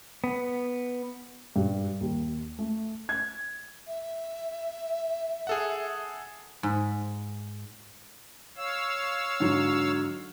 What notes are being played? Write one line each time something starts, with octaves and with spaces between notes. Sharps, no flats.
B3
G2
D#2
A3
G#6
E5
G#4 A4 F#5
G#2
C#5 F5 E6
G#2 D3 F#3